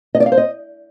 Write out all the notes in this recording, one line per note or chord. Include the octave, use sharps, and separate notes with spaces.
D#5
D5
F5
C5
D#5